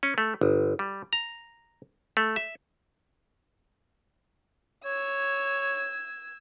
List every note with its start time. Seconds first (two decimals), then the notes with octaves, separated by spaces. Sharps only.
0.03 C#4
0.18 A3
0.41 G1
0.79 G3
1.13 A#5
2.17 A3
2.36 E5
4.85 C#5 E6 G#6